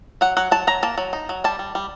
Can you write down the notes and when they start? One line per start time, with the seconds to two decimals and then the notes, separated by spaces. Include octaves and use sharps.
0.21 F#3 F#5
0.37 F#3 F#5
0.51 F#3 A5
0.67 F#3 A#5
0.83 A#3 A5
0.98 F#3
1.13 D#4
1.29 F#3
1.44 G3 A5
1.59 G3
1.75 G3